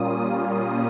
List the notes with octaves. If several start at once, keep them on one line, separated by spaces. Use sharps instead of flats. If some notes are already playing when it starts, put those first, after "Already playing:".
Already playing: A#2 G3 A#3 C#4 F4 D#6
D#6